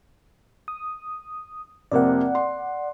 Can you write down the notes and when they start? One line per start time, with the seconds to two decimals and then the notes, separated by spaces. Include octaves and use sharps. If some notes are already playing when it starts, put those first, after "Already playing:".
0.68 D#6
1.92 F2 C3 A#3 D5 F#5
2.35 C6